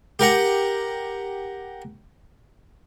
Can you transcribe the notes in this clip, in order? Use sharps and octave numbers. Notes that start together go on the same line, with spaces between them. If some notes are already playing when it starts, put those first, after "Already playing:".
G4 A#4 F#5